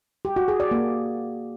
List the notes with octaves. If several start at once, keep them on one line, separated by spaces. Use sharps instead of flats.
G4
F#4
G#4
D5
A#3